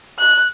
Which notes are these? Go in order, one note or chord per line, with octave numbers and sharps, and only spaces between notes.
F#6